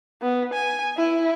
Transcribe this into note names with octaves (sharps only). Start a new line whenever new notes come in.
B3
G#5
E4